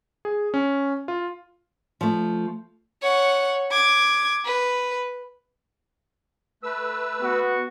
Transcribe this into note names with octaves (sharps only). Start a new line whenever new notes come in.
G#4
C#4
F4
F3 A3
C#5 F#5
D6 G#6
B4
A3 B4 E6
B3 F#4